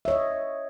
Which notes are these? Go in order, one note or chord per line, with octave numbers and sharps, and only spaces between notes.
C#5 D#5 E5